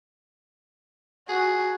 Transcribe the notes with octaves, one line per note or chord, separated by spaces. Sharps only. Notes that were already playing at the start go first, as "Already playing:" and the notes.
F#4 G#4